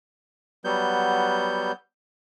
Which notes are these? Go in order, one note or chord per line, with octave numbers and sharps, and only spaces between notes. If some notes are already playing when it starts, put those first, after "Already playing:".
F#3 G3 B3 G6